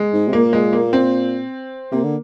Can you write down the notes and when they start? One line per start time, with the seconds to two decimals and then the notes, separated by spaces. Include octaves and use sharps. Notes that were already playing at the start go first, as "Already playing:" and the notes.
Already playing: G#3
0.13 G#2
0.28 C3
0.33 A#2 A#3
0.53 G#3
0.73 A#3
0.93 C4
1.92 C3 A#3
2.04 D3